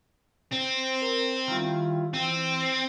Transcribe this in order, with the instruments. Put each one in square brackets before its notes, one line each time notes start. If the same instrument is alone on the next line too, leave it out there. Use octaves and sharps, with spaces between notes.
[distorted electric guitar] C4
[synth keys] A#4
[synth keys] D#3 G5 F6 [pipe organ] G3 E4 F4
[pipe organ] E3 E6 [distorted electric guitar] C4 [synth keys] G5 D#7